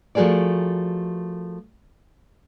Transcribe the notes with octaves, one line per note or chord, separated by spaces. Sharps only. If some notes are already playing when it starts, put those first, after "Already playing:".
F3 A3 F#4 G#4 A#4 D5